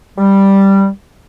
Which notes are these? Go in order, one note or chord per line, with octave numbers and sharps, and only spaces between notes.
G3